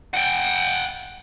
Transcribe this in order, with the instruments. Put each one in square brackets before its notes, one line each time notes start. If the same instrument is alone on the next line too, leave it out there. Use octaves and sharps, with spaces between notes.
[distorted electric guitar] F#5 G5